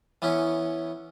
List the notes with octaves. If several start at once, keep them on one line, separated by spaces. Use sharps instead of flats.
E3 B3 C#4 E4